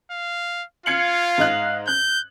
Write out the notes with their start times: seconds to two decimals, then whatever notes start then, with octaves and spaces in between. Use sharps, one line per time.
0.11 F5
0.86 F4 F5 G#6 C#7 F#7
1.38 G#2 D#5 F#6
1.88 F#6 G6